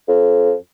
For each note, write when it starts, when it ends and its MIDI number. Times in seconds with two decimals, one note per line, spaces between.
0.08 0.53 41